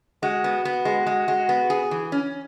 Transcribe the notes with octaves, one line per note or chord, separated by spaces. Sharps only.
G#3 F#4
B3
B3
G#3
G#3
G#3
B3
G#4
E3
C#4